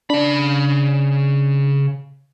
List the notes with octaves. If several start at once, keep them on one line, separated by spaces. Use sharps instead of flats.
C#3 D4 B5